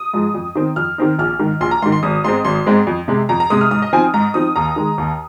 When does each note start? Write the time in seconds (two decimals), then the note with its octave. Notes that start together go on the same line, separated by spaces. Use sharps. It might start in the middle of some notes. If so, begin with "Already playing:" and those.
Already playing: D#6
0.13 G#2 F3 G#3
0.34 F2
0.55 D#3 C4 D#4
0.76 F2 F6
0.98 D#3 C4 D#4
1.19 A#1 F6
1.39 G#2 D#3
1.61 A#1 C6
1.71 A#5
1.82 G#2 D#3 C6
1.92 C6
2.03 G#1 D#6
2.24 G#2 G#3 C4 C6
2.45 G#1 C6
2.66 G#2 G#3 C4
2.87 F2
3.08 C3 G#3
3.29 F2 A#5
3.40 A#5
3.50 C3 G#3 D#6
3.61 F6
3.71 G#2 D#6
3.82 D#5
3.93 F3 C4 D#4 G#5
4.14 G#2 A#5
4.34 F3 C4 D#4 D#6
4.56 D#2 A#5
4.76 D#3 G#3
4.98 D#2